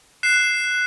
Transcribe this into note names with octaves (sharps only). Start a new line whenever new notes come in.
F#6 C7 E7